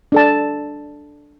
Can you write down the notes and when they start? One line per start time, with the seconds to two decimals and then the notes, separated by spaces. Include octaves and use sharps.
0.12 D4 A4 A5